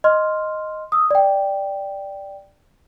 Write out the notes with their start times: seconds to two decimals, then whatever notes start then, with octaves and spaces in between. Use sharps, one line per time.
0.04 D#5 C6 F6
0.92 D#6 E6
1.11 D5 G5